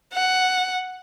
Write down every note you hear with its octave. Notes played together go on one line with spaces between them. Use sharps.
F#5